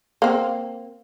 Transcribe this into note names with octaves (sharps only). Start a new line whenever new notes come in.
A#3 C4